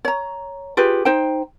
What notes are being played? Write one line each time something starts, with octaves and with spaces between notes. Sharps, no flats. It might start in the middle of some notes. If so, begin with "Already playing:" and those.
C#5 A#5
F4 G4 G#4 B4
D#4 C5 G5